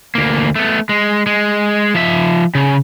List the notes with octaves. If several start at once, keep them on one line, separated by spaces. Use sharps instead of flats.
D2 A#3
A3 B3
G#3
G#3
F3 E5
C#3